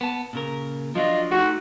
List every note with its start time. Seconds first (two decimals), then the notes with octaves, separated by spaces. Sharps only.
0.01 B3 A5
0.33 A#2 C#3 A#4
0.95 F3 F#3 D4 F4 D#5
1.31 A3 D#4 F#4